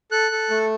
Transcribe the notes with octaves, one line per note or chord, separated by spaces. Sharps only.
A4 F#6
A4
A3